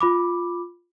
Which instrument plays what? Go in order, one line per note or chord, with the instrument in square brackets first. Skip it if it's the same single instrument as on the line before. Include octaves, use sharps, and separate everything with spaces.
[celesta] F4 B5 D6